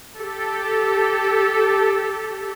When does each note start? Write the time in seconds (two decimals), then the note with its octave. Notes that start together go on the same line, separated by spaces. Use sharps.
0.20 G4 A4